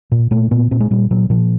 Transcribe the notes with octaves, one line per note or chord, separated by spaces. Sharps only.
A#2
A#2 A3
A#2 B3
A#2 C4
G#3
A#2 G3
A#2 F#3
A#2 F3